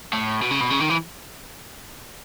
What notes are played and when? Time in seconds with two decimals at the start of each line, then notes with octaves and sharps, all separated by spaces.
0.13 A2
0.42 B2
0.51 C#3
0.61 B2
0.71 C#3
0.80 D#3
0.90 E3